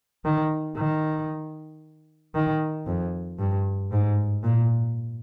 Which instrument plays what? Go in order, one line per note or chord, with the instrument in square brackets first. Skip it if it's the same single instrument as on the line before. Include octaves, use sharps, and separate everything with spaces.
[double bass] D#3
D#3
D#3
F2
G2
G#2
A#2